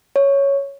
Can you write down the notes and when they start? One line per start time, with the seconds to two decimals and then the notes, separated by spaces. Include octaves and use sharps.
0.16 C#5